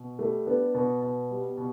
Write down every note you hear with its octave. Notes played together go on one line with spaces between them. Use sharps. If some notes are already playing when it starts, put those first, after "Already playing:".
Already playing: B2
G3 A3
B3 D4
B2 B3
B2
G3
B2